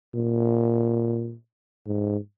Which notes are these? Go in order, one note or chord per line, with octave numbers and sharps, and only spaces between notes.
A#2
G#2